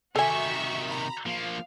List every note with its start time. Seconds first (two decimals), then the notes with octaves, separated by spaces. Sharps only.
0.16 C3 D#3 F#4 A4 E5 G#5 C#6
0.85 A#5 B5
1.26 F3 A#3 F5